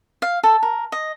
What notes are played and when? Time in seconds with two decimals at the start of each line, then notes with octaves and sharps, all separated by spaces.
0.22 F5
0.43 A4
0.63 A#4
0.92 D#5